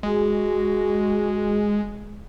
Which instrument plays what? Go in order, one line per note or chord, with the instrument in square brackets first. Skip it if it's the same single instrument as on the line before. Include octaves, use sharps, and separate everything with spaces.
[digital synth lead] G#3 [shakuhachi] F#4